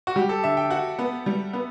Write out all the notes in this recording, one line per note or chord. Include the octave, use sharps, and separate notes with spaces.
F#4
G3 G4
A4
D3 E5
G5
F#4 F#5
B3
G3
B3